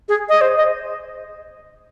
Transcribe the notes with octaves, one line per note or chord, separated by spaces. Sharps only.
G#4
D#5
C5
D#5